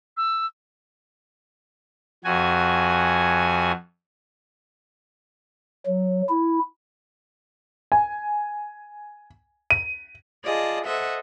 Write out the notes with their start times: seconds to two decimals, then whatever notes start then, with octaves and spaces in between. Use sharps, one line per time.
0.17 E6
2.24 F2 F#4 G#5
5.86 F#3
6.29 E4
7.92 G#5
9.70 D#7
10.44 F4 G#4 D5 D#5 A5
10.85 A4 C5 D#5 E5 F#5